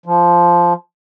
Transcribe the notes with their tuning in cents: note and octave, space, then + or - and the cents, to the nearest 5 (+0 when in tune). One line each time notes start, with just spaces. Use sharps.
F3 -5